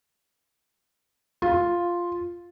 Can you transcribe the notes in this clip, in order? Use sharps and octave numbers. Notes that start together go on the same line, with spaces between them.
F4